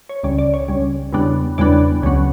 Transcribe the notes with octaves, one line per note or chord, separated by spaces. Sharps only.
C#5
C#2 C#3 G3 C#4 D5
D5
C#5
C#2 C#3 G3 C#4
E2 C#3 G3 B3 D4
E2 C#3 G3 B3 D4 D5
C#2 C#3 F#3 B3